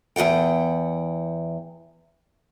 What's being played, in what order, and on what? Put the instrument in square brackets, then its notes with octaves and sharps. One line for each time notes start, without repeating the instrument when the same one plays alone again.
[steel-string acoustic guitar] E2 G#2 F#5 G5